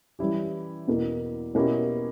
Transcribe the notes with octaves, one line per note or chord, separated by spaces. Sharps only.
E3 G3 C#4 E4 G4
E2 B2 A#3
B2 A#3 C#4 E4 G4